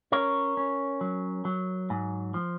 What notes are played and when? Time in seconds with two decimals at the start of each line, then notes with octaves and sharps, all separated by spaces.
0.12 C#4 A#4 C#5
0.57 C#4
1.01 F#3
1.45 F#3
1.90 G#2
2.34 F3